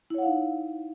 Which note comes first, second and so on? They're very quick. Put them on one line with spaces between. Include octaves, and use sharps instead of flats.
E4 C#5 F#5 F5 D#4